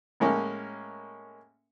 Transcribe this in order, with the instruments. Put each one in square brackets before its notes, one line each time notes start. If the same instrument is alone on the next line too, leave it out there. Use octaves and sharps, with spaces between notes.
[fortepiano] A2 G#3 A#3 C#4